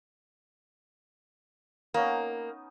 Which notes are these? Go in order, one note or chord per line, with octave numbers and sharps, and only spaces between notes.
A#3 B3 C#4 D#4